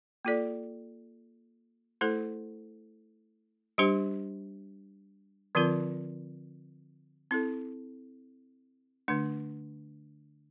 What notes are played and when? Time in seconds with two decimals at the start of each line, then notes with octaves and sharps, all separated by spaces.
0.25 A#3 F4 A4 D5
2.01 A3 E4 A4 C5
3.78 G3 D4 G4 C5
5.55 D3 F3 C4 F4 A#4
7.31 C4 E4 A4
9.08 D3 A3 D4